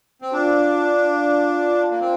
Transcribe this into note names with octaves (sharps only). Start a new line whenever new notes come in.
C4
D4 F4
A#3
C4